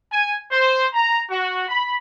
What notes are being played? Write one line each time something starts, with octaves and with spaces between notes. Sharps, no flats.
G#5
C5
A#5
F#4
B5